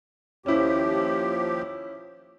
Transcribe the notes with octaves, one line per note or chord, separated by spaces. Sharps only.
D#2 F3 C#4 E4 G4